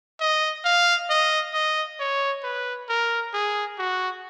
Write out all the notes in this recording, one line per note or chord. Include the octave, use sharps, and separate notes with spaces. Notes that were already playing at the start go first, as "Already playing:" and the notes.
D#5
F5
D#5
D#5
C#5
B4
A#4
G#4
F#4